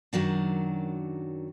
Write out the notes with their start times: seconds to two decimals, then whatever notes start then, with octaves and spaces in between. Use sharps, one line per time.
0.13 F#2 C3 D#3 F#3 D4